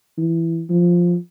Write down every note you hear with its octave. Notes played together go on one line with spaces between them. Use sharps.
E3
F3